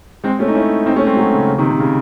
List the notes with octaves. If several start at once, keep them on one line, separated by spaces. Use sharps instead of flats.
G#3 C4
A3 C#4
D#4
C#4 E4
C4 D#4
A3 C#4
G#3 C4
F#3 A3
C#3
C#3
C3 D#3
C3
C#3